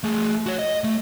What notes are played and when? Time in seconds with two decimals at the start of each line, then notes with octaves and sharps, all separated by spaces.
0.03 A3 G#4
0.46 F#4 C#5
0.59 D#5
0.84 A3